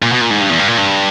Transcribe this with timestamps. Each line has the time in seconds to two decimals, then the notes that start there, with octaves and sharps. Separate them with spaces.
0.02 A#2
0.12 B2
0.21 A#2
0.31 G#2
0.41 G2
0.50 E2
0.59 G2
0.68 A#2
0.78 G2